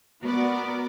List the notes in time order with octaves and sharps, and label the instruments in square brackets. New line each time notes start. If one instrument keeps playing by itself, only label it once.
[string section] B3 F#4 A#4 D5